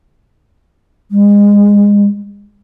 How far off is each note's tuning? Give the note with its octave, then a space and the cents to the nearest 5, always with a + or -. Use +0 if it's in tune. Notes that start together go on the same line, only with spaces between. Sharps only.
G#3 -25